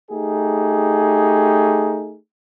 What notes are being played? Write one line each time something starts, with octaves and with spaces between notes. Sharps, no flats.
A3 D#4 G4 G#4